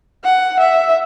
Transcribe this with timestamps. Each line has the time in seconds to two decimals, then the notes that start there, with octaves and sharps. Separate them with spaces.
0.24 F#5
0.60 E5